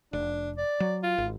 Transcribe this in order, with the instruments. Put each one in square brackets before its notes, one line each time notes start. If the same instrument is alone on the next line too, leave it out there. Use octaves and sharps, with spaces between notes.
[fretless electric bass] F1 [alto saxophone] D4
[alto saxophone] D5
[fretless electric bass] F#3
[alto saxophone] F4
[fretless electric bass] G#1